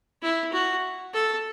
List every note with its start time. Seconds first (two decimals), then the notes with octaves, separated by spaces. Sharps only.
0.22 E4
0.52 F#4
1.14 A4